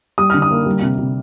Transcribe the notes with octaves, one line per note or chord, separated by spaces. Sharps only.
G3 D#6
D3 F6
D#6
A#3
G3
C3
C3